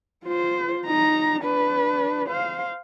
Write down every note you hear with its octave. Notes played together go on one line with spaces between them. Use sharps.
F4 C5
D#4 A#5
D4 B4
C5 F5